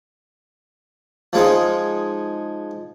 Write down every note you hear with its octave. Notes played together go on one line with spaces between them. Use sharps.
F3 G#3 D#4